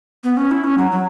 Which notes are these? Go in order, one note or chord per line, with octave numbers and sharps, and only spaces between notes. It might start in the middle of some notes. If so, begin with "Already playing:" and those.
B3
C#4
E4
C#4
F#3
F#3